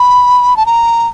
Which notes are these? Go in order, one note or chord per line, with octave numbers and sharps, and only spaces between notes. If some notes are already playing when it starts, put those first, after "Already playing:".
Already playing: B5
A5
A#5